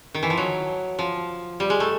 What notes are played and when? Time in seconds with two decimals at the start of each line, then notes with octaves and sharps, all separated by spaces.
0.15 D#3
0.23 E3
0.30 F3
0.38 F#3
0.99 F3
1.60 G3
1.70 G#3
1.80 A3